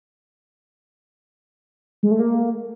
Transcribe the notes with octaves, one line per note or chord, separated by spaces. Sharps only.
G#3
A3
A#3